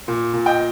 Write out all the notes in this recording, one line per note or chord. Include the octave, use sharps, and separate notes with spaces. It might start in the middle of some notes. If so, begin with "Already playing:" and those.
A#2
A#2
D#5 G5